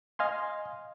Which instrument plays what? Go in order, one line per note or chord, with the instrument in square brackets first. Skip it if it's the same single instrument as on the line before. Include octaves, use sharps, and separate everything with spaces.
[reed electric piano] D#5 F5 G#5 C6